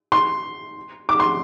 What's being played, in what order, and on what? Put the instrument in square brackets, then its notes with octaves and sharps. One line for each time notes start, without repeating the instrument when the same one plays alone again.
[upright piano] C6
D6
C6